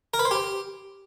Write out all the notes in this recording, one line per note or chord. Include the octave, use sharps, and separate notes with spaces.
A#4
B4
C5
G4